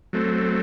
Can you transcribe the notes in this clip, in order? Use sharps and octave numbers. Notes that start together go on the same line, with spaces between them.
F#3 A3 C4